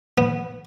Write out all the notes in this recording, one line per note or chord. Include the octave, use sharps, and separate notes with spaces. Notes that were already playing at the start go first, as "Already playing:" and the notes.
B3